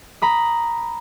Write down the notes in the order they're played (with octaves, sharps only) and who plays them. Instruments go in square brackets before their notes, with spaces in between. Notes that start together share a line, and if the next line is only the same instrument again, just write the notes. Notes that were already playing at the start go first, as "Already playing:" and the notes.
[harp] A#5 B5 D#6